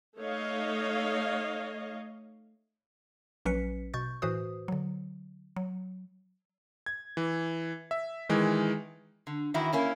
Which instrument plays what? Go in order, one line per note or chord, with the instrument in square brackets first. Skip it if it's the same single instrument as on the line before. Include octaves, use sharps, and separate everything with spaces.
[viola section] A3 D#4 C#5 D#5 F5
[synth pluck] A#1 F#3 C#4 B4 B6 C#7
B2 C#6 G6 A6
A2 E3 F#4 B4 C5 D#6
D3 F#3
F#3
[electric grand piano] G#6
E3
E5
D#3 E3 G#3
[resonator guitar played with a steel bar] D3
D#3 E3 E4 F#4
A#3 C#4 E4